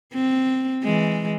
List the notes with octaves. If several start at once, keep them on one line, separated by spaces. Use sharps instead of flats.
C4
E3 G#3